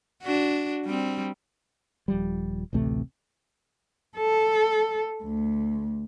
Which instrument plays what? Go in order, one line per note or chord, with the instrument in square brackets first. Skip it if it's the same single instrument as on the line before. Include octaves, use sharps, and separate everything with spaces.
[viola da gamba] D4 F#4
G3 C4
[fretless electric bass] D#1 F3 G3
A1 D2 C3 A3
[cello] A4
D2